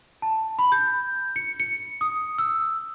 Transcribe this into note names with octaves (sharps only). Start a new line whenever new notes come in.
A5
B5
G6
C#7
C#7
D#6
E6